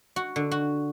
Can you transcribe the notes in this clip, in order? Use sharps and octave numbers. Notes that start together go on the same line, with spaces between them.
F#4
D3
F#4